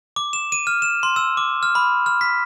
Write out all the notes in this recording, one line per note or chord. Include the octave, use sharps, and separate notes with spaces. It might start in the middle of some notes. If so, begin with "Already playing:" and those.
D6
E7
D#7
F6
E7
C6
E6
D6
F6
B5
F6
B6